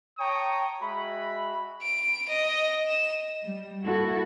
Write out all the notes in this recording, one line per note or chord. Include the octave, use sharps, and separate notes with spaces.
C#5 G5 A5 A#5 C#6 D#6
G#3 F#4 E5 B5
D7
D#5
E7
G3
A#3 E4 F#4 A4